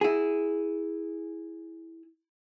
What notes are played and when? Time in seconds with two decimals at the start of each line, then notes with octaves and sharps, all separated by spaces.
0.01 E4 G#4